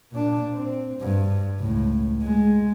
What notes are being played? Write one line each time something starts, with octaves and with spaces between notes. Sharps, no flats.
A#2 D4
C4
G2
C#2 A2
G#3